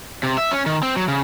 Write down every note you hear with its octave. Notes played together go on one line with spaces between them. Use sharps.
C3
E5
C#4
D#3
C4
F#3
C#3